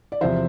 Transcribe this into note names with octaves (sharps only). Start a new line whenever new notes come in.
D5
E2 C3 F3 C5 E5